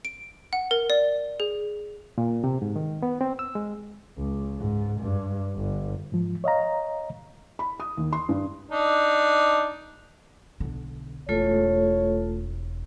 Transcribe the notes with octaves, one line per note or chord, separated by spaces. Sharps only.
D7
F#5
A#4
D5
G#4
A#2
C3
G#2
D#3
B3
C4
E6
G#3
C#2
G#2
G2
G1
G#2 F3
C#5 D#5 F5 A#5
B5
D#6
D#2
C6
G2
D4 D#4
B1 D3
E1 A3 F4 A4 C#5